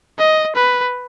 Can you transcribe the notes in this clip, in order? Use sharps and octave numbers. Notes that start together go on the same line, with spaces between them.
D#5
B4